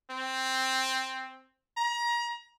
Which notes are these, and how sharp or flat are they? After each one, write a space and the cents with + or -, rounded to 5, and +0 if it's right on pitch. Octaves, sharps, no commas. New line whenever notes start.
C4 +5
A#5 +35